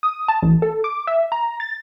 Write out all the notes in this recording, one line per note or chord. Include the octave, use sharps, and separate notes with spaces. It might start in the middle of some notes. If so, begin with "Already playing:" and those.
D#6
A5
A1
A4
D6
E5
A#5
A6